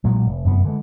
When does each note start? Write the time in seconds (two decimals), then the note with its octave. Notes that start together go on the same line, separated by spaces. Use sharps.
0.04 B1 A#2 F#3 G#3
0.26 F1
0.44 F1 F#2 B3
0.64 D3 E3 F3 G#3